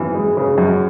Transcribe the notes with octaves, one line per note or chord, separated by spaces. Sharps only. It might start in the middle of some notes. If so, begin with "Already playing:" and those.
Already playing: F#2 E3
G#3
C#3
F#2